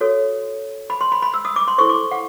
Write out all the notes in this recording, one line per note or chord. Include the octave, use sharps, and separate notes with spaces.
F#4 A4 C#5
B5
C6
B5
B5
E6
D#6
D6
C6
E4 A4 C5 C#6
D6
F#5